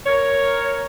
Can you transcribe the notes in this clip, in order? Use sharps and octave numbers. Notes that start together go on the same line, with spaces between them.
A#4 C#5